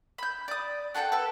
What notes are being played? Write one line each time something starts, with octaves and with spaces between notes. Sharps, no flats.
B5 G6
D5 D#6
F#4 A4 F#5 G5
A4 B4